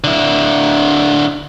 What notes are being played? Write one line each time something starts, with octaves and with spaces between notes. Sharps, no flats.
D3 E4